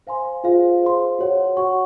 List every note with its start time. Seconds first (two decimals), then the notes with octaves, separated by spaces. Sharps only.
0.07 C5 F5 G#5 C6
0.44 F4 G#4 C5 F5
0.82 G#4 C5 F5 C6
1.19 F#4 C#5 F#5
1.57 F#4 C#5 F#5 C#6